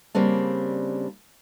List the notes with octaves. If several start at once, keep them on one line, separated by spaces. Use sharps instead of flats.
C#3 G3 A#3 C4 D4